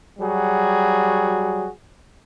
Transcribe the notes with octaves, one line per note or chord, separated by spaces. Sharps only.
F#3 G3 F#4 G#4